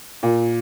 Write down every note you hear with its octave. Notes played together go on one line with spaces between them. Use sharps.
A#2